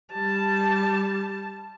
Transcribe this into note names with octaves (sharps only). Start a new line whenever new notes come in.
G3 A5